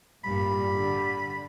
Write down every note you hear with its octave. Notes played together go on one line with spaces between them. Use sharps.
A1 G2 A#2 G3 B5
D3